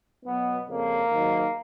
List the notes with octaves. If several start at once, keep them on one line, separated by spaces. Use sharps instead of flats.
B2 F#3 B3
F2 C#3 F3 A#3
G#2 D#3 F#3